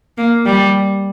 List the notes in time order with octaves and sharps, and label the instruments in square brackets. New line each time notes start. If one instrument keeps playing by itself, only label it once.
[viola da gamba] A#3
G3